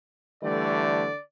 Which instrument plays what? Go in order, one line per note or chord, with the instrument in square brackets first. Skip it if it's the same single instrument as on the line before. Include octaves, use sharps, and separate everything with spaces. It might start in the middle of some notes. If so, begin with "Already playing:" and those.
[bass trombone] D3 [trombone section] E3 G3 A3 [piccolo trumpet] D5